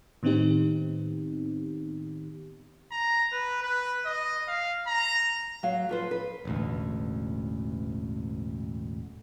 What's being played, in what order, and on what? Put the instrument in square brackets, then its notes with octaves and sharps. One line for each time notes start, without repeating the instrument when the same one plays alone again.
[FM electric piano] A2 D#3 B3 C4 D#4 G4
[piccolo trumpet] A#5
B4
B4
D#5
F5
A#5
[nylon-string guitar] F#3 F5
F3 B4 C5
B4
[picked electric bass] E1 A1 D2